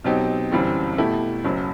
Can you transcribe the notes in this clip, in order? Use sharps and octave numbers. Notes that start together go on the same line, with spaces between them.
B2 F#3 C4 D#4 G4
G1 F#2 E3 G3 C4
B2 A3 E4 G4
F#1 F#2 F#3